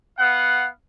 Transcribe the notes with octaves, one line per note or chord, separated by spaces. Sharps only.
B3 F5 F#5